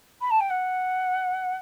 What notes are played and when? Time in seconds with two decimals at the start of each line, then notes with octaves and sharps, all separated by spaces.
0.21 B5
0.30 A5
0.40 G5
0.50 F#5